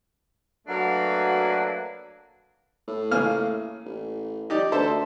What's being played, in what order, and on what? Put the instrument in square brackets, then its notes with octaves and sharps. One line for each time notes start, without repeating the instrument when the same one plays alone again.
[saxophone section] F#3 A3 A#3 D4 F#4 B4
[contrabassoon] A2
[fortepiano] C#3 A#3 F6
[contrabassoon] A1
[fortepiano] D#4 G4 D5
[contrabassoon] D2 [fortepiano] A4 C5 E5